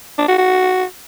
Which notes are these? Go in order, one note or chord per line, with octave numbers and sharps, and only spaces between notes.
D4
F#4
F#4